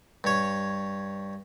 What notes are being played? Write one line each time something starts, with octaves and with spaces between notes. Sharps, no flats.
G2 C#5